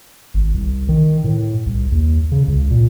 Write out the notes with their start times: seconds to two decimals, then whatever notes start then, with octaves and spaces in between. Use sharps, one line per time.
0.34 G#1
0.54 C2
0.89 D#3
1.24 A2
1.66 C2
1.92 D#2
2.32 C#3
2.48 C#2
2.71 A#2